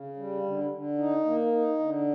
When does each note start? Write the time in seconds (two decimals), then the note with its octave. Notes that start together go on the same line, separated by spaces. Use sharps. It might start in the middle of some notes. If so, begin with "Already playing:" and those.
Already playing: C#3
0.16 G3
0.43 D3
0.70 D3
0.98 D#4
1.25 A#3
1.52 D#4
1.79 D3